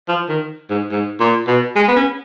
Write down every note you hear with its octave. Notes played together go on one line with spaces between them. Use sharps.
F3
D#3
G#2
G#2
A#2
B2
G#3
B3
C#4